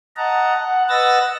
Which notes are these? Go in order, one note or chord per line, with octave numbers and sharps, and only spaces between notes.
D#5 F#5 A5 A#5
F#5
B4 D#5 F#5 E6 A6 A#6